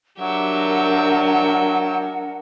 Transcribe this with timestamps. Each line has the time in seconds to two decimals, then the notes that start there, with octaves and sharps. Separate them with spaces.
0.20 F#3 D4 G4 A#4 E5 F#5